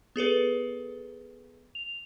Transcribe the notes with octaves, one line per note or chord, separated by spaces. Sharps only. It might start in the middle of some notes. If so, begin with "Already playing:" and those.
B3 G#4 A4 B4
F7